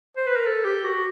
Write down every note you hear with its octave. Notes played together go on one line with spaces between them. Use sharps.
C5
B4
A#4
A4
G4
F#4